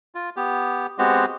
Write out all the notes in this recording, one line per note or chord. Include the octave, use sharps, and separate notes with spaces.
F4
B3 G4
G#3 B3 C4 F#4 G4